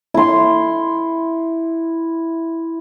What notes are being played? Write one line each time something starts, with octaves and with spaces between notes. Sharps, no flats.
E4 C6